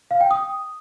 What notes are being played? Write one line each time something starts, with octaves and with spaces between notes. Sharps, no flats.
F5
G5
D#6